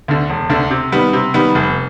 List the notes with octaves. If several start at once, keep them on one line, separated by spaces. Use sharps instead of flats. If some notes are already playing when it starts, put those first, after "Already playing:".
D2 D3
E1
D2 D3
C3
D#3 G3 B3
C3
D#3 G3 B3
F1